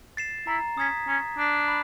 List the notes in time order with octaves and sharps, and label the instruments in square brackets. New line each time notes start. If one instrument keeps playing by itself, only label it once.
[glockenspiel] A6 C7 E7
[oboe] E4 [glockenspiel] A#5
[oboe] C#4 [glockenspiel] D#6 G#6 B6
[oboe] C#4 [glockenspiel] A#5
[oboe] D4 [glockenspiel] D#6 G#6 B6
[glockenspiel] B5